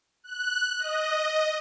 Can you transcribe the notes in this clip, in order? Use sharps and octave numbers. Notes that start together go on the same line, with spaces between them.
F#6
D#5